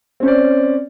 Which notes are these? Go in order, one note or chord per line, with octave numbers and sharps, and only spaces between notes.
C4 C#4 C5 D5